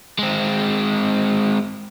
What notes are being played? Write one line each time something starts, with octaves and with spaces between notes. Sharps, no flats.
G#3 C4